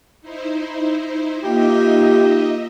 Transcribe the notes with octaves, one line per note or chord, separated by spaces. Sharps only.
D#4 E4 C5
A#3 D#4 F4 G4 D#5 E5